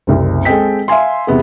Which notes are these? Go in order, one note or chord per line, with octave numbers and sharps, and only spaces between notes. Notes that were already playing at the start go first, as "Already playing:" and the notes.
F#1 C2
G#3 C4 A4 D#5 G5 B6
E5 F5 G#5 C6
E2 C3 B3 G#4